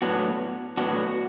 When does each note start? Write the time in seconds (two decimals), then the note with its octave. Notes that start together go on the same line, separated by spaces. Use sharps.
0.02 A2 F#3 B3 D4 F#4
0.77 A2 F#3 B3 D4 F#4